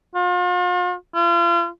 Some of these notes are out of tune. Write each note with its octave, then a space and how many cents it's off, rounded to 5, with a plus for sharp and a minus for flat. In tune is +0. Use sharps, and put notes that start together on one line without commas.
F4 +40
F4 -40